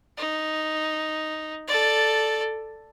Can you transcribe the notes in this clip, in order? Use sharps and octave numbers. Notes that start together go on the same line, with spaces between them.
D#4
A4 D5